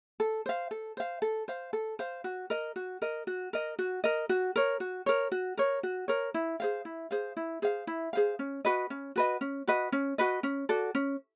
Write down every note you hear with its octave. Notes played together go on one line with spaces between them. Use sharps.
A4
C5 F5
A4
C5 F5
A4
C5 F5
A4
C5 F5
F#4
A#4 D#5
F#4
A#4 D#5
F#4
A#4 D#5
F#4
A#4 D#5
F#4
A#4 C#5
F#4
A#4 C#5
F#4
A#4 C#5
F#4
A#4 C#5
E4
G#4 C5 F5
E4
G#4 C5 F5
E4
G#4 C5 F5
E4
G#4 C5 F5
C#4
F#4 B4 D#5
C#4
F#4 B4 D#5
C#4
F#4 B4 D#5
C#4
F#4 B4 D#5
C#4
F#4 A4 D5
C#4